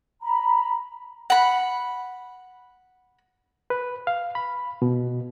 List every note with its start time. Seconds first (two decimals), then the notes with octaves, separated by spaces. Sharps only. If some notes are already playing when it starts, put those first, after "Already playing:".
0.22 A#5 B5
1.30 F#5 B5
3.70 B4
4.07 F5
4.35 B5
4.82 B2